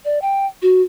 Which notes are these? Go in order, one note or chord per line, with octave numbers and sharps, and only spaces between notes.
D5
G5
F#4